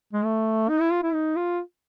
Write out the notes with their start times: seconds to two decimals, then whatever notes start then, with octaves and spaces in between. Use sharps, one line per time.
0.13 G#3
0.24 A3
0.69 D#4
0.80 E4
0.91 F4
1.03 E4
1.13 D#4
1.36 F4